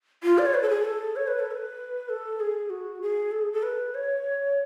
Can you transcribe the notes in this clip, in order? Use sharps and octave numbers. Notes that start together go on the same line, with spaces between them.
F4
D5
C#5
B4
A4
G#4
A4
C#5
B4
A4
B4
A4
G#4
F#4
G#4
A4
G#4
A4
B4
C#5